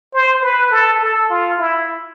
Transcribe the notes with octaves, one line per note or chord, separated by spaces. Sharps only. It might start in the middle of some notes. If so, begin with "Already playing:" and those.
C5
B4
A4
A4
F4
E4